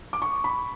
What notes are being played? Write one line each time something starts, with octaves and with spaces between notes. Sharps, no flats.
D6
C#6
B5